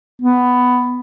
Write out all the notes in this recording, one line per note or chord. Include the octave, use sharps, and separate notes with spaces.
B3